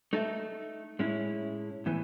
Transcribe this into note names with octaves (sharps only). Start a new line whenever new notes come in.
A3 D#4 A4 E5
A2 G#3 C#4 E4
A2 E3 B3